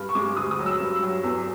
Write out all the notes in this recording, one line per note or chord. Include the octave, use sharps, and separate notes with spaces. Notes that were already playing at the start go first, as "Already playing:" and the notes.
Already playing: G2
C#6
G#3 D6
D2 D#6
D#6
F#3
E6
G2
F#3
E2